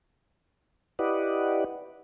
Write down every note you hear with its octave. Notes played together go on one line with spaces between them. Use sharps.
E4 G4 B4 D5 D#5 F#5